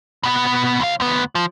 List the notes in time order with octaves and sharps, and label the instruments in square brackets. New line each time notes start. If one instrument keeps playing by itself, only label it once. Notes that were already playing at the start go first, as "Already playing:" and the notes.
[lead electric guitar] B2 B3
C#2 F5
D2 B3
F3